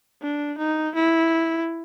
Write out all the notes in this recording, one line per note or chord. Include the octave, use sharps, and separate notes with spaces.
D4
D#4
E4